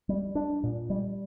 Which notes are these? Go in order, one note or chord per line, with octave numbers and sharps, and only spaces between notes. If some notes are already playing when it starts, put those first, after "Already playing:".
G3
D4
A#2
G3